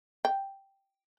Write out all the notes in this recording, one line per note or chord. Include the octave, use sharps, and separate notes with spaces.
G5